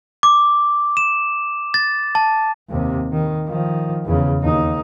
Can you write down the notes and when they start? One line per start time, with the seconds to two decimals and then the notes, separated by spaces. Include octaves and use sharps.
0.23 D6
0.97 E7
1.74 A6
2.15 A5
2.69 D#2 C3
3.12 D#3
3.46 D#3 F3
4.05 E2 C#3
4.40 D#2 D#4